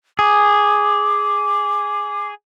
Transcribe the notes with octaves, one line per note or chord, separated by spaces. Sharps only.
G#4 D6